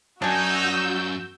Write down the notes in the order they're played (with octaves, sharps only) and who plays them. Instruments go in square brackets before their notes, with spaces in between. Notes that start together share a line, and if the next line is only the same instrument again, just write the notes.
[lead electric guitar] F#2 [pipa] D4 G#5 [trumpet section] D#4 [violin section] F#4 E6 G6